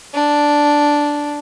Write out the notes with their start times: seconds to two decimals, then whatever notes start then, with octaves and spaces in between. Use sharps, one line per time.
0.14 D4